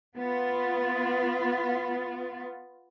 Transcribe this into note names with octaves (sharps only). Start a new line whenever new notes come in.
B3 F4